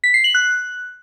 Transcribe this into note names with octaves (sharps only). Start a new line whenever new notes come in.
B6
C7
F#7
F#6